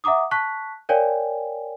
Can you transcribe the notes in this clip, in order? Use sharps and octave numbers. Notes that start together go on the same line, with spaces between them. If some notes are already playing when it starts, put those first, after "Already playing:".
E5 F#5 A#5 D6 D#6
A5 C#6 F#6 B6
A#4 C#5 D5 F5 G5 G#5